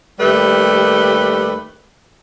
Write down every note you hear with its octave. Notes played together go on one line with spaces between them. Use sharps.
D#2 G3 A3 G4 B4